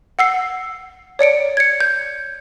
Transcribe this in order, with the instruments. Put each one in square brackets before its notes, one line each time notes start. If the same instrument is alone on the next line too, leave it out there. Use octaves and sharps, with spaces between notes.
[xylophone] F#5 E6 C7
C#5 D5 C#7 D7
G#6 C#7
G6